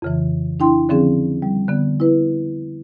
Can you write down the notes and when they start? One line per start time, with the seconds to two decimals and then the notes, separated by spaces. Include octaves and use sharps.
0.02 F2 C#3 E3
0.60 D4 E4 G5 C6
0.89 D3 F3 C4 C#4 G#4
1.42 G3
1.68 D3 B3
2.00 E4 B4